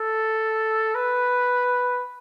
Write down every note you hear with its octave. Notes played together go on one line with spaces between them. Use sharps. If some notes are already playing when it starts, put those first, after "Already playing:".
Already playing: A4
B4